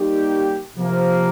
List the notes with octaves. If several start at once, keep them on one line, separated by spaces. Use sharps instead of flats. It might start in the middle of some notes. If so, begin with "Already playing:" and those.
Already playing: G3 A#3 D#4 G4
C3 F3 A#3